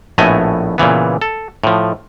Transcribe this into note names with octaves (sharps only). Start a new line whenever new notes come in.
A#1 A2 A3 B3 D#5 G#5
A#2 C#3 E3 B3
A4
A2 F3